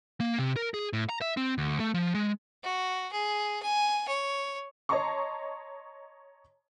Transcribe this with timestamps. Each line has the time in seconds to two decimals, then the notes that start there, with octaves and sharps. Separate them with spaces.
0.20 A#3
0.39 C3
0.56 A#4
0.74 G#4
0.93 A2
1.09 A#5
1.21 E5
1.37 C4
1.58 D2
1.80 A3
1.94 F3
2.15 G#3
2.63 F#4
3.13 G#4
3.63 G#5
4.08 C#5
4.89 C#5 D#5 A5 A#5 C6 C#6